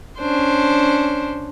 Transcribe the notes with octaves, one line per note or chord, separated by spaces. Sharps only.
C#4 D4 C5